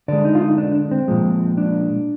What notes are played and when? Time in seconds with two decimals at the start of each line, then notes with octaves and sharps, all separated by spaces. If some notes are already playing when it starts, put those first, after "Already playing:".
0.08 D3 G#3 D5
0.25 D#4
0.35 F4
0.41 D#4
0.58 D4
0.75 D4
0.91 C4
1.08 A#2 F3 G#3
1.57 D4